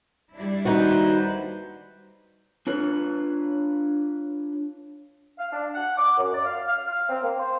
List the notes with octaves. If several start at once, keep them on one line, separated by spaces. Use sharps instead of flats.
G3 D4 E4
D#2 D#4 F#4 B4 C5
D4 F4 B4 C#5
F5
D4
F#5
D6
F#2
D5
F5
F6
F5
C4
A#3
C5